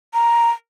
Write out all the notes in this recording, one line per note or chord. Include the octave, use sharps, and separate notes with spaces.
A#5